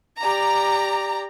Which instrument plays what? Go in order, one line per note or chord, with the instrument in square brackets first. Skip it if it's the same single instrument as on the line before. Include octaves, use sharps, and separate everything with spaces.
[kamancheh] G4 D5 [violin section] A#5